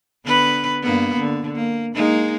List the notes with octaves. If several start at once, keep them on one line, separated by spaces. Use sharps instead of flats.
D3 B3 B4
G2 A#3 B3
D3
A#3
G#3 A#3 D#4